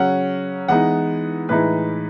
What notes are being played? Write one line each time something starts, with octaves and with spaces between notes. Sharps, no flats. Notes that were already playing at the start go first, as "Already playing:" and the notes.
Already playing: C#3 F#3 C#4 F#5
E3 G#3 B3 D#4 F#5
A2 E3 G#3 D#4 B4